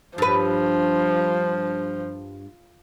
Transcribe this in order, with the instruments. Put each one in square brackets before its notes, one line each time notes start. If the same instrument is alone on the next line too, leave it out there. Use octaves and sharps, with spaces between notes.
[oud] G2 B4 [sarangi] F3